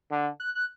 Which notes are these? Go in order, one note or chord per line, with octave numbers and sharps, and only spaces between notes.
D3
F#6
F#6